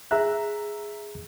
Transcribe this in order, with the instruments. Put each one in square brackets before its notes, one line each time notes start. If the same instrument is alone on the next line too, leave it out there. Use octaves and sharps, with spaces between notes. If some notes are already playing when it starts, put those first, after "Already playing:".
[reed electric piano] G#4 A#5 F#6 [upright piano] E5